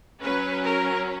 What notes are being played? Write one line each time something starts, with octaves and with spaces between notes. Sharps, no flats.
F#3 C#4 B4
A#4